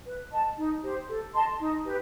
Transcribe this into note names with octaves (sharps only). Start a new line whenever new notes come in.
B4
D#5 A5
D#4
G4 C5
A4
D#5 A5 C6
D#4
G4 B4